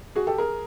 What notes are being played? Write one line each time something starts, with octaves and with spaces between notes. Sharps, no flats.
F#4 G#4
G4 A4
G#4 A#4